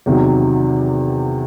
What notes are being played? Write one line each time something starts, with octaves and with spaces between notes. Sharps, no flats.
E2 C3 D#3 F#3